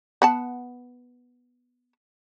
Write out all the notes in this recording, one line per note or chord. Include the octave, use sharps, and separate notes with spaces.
B3 F#5 A5